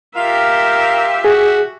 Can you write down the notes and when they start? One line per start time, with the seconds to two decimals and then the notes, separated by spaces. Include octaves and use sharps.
0.16 F4 G4 A#4 E5 F5
1.25 F#4 G#4